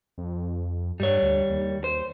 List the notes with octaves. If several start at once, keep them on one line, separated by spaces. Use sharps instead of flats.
F2
G2 G3 C#5
D2
D#2
C5